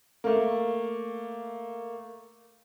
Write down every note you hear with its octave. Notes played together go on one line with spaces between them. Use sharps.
A3 A#3